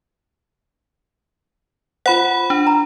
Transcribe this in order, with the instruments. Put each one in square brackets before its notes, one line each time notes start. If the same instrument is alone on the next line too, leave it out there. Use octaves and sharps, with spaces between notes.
[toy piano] F4 C5 [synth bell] F#5 B5
[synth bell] D4
[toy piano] A#5